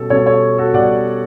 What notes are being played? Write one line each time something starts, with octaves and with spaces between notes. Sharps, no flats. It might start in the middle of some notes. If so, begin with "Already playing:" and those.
Already playing: B2 G3 C#4 A4
B2 G3 C#4 A4 C#5
A4 C#5
F#4 A4
B2 G3 D5 F#5